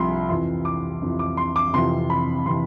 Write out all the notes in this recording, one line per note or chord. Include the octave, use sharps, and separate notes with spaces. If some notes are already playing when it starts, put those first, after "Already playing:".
Already playing: C2 C3 F3 B5 C6
F2 E3 C6
D6
F2 E3
D6
C6
D6
F2 C3 E3 C6
B5
C3 E3 C6